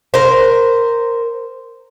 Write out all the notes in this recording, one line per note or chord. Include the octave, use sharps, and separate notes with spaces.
A#4 C5